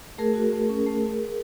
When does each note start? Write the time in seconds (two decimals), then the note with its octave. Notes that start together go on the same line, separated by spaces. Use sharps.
0.18 A3 G#4 A#4
0.35 F#4
0.53 A3
0.69 C#4
0.86 A3